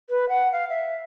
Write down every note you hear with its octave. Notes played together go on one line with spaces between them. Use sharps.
B4
F#5
F5
E5